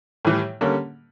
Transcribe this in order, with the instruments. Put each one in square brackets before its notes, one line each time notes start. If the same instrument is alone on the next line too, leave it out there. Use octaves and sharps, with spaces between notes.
[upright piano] A2 E3 G3
D3 G3 A#3 C#4